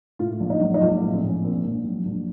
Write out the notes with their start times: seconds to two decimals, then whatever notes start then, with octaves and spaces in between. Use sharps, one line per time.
0.19 A2 F4
0.40 A#1
0.50 D#4
0.61 F#3
0.74 D#4
0.81 A#1 F4
1.02 A2
1.13 C4
1.23 A#1
1.28 C#4
1.44 A#2 C4
1.64 A#1
1.84 F#3
2.05 A#1